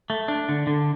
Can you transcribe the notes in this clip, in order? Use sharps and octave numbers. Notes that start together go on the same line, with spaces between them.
A3
D4
D3
D3